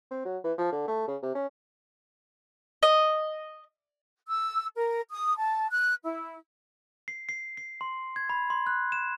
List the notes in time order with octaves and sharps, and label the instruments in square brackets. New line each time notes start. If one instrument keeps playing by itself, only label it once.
[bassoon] C4
F#3
E3
F3
D3
A3
C#3
C3
C#4
[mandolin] D#5
[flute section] E6
A#4
D#6
A5
F#6
E4
[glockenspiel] C7
C7
C7
C6
G#6
B5
C6
F#6
E7